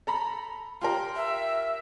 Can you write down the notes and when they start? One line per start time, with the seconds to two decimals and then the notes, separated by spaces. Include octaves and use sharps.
0.07 A4 A#5 B5
0.81 F4 G4 A#4 C6
1.16 E5